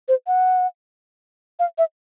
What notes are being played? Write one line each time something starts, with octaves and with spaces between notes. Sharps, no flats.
C5
F#5
F5
E5